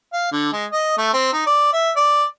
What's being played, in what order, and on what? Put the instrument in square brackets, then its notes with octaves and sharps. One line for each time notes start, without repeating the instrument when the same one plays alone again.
[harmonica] F5
D3
G#3
D#5
A3
C4
D#4
D5
E5
D5